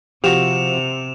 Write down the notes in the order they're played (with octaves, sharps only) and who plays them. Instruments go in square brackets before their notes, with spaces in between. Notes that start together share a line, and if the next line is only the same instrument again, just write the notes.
[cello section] C3 [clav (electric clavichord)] F3 F#4 [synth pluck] G4 [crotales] E7 F7